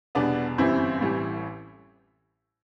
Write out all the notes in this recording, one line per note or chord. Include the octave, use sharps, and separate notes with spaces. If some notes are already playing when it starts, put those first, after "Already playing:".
E2 B2 G3 B3 D4
G1 F#2 E3 G3 C4 E4
A1 A2 E3 G3